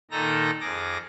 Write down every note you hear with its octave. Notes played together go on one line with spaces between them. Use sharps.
A#2 D#3 D#4 A4 A#5 A#6
F2 G#4 D6 A#6